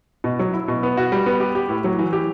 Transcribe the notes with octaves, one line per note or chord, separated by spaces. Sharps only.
B2
F#3
E4
B2
B3
F#4
G3
B3
G4
G4
A2
F#3
E3
G4